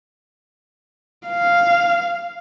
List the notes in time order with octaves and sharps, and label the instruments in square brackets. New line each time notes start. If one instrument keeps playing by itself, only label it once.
[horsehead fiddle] F5